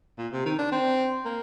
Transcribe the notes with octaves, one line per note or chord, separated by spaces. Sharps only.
A#2
C3
D#3
D4
C4
A#3